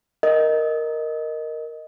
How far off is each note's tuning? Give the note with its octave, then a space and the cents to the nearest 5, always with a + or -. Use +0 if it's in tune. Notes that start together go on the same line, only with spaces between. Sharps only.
A#4 +0 D#5 +0